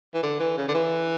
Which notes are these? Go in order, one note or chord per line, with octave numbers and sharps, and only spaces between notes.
E3
D3
E3
C#3
D3
E3